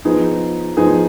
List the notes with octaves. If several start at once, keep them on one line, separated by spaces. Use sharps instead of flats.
F3 B3 D#4 G#4
F3 B3 D#4 G#4